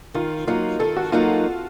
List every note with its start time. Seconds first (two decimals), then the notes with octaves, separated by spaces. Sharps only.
0.14 D#3 F4
0.47 F#3 A#3 D#4 F4
0.80 D#3 A4
0.97 F#4
1.12 F#3 A#3 D#4 F4